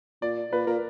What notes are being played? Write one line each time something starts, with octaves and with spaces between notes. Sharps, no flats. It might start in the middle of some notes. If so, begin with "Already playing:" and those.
A#2 D5
A#2 B4
A#2 A#4